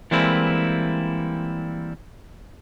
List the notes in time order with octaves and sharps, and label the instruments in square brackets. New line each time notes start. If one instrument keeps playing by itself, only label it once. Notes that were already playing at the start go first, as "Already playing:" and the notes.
[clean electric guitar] E3 G3 G#3 A#3 C4 E4